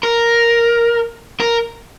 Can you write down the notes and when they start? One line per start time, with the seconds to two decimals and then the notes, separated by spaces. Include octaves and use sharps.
0.03 A#4
1.40 A#4